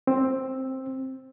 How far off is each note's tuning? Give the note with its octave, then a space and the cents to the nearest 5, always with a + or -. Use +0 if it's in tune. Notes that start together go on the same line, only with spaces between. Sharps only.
C4 +10